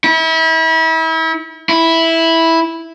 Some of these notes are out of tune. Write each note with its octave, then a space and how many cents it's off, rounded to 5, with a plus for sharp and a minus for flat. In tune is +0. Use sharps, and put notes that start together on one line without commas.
E4 -35
E4 -5